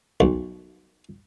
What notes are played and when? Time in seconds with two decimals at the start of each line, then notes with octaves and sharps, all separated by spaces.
0.20 B1